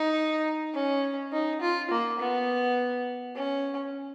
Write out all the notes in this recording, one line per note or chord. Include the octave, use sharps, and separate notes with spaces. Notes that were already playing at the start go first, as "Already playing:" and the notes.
Already playing: D#4
C#4
D#4
F4
A#3
B3
C#4